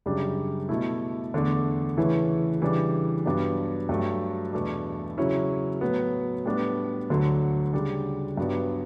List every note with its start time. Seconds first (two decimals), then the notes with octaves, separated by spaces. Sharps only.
0.06 F#2 C#3 G3 D4
0.69 B2 A3 E4
1.34 E2 D3 A3 D4
1.97 C#3 E3 A3 C#4 E4
2.62 C#3 E3 G3 D4
3.26 G2 F#3 B3 D4
3.89 G2 F#3 A3
4.53 E2 B2 A3 D4
5.17 C#3 F#3 C#4 E4
5.81 A2 F#3 B3
6.45 A2 G3 B3 D4
7.10 D2 D3 F#3
7.73 C#3 G3 D4
8.37 G2 F#3 B3 D4